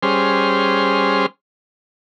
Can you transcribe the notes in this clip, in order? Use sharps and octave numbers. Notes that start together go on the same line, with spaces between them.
G3 C#4 G#4 C5 C6 F6